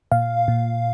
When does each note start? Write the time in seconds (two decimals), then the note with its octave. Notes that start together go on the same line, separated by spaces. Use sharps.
0.12 A#2 F5
0.48 A#2